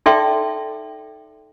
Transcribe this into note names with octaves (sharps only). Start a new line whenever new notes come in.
D#4 A4 D5 E5 G5 C6